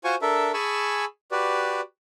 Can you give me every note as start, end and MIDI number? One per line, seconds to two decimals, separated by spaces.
0.04 0.15 65
0.04 0.15 66
0.04 0.15 72
0.04 0.15 80
0.04 0.15 85
0.22 0.52 62
0.22 0.52 69
0.22 0.52 70
0.22 0.52 76
0.54 1.05 68
0.54 1.05 80
0.54 1.05 81
0.54 1.05 83
0.54 1.05 85
0.54 1.05 88
1.31 1.81 66
1.31 1.81 67
1.31 1.81 71
1.31 1.81 74